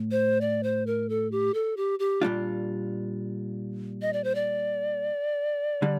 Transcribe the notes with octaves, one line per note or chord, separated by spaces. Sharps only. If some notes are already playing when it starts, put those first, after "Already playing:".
Already playing: A2
C5
D5
C5
A#4
A4
G4
A4
G4
G4
A#2 G3 D4 F4
D#5
D5
C5
D5
D3 G3